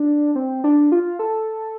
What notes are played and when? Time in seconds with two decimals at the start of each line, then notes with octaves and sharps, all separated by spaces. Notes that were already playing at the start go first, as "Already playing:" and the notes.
Already playing: D4
0.36 C4
0.64 D4
0.92 F4
1.19 A4